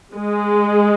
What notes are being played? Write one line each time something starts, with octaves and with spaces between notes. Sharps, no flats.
G#3